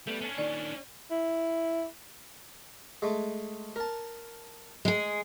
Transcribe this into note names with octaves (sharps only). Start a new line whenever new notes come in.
G3 A3 B3
C#4 D4
A#2 D#3 D5
E4
G#3 A3
A#4 A5
G#3 G#4